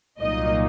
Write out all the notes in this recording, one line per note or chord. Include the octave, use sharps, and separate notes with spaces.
C2 A#2 F#3 A#3 D#4 D#5